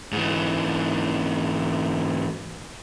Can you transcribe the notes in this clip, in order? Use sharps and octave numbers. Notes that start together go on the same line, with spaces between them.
G#2 E3